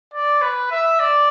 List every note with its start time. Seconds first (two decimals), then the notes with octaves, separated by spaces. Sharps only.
0.14 D5
0.42 B4
0.71 E5
1.00 D5